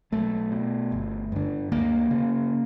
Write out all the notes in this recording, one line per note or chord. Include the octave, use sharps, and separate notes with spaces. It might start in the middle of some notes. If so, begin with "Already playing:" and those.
B1 A3
B2
G1
G2 D3
D2 A#3
C#3